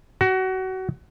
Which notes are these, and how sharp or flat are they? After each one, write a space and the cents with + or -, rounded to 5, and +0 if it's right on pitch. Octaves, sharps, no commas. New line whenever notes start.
F#4 +25